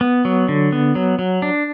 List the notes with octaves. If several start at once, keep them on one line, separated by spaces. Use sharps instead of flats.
B3
F#3
D3
B3
F#3
F#3
D4